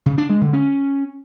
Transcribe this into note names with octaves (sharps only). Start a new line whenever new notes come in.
C#3
D4
G#3
D3
C#4